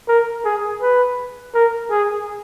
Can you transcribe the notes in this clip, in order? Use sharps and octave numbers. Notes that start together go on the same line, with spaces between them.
A#4
G#4
B4
A#4
G#4